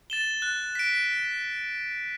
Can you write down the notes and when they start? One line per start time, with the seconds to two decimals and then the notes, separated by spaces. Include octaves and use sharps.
0.10 A6 E7 G7
0.42 F#6
0.75 B6 D7